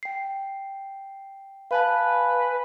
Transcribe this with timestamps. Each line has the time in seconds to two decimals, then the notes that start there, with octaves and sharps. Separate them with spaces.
0.03 G5 C7
1.71 B4 F5 G#5 A5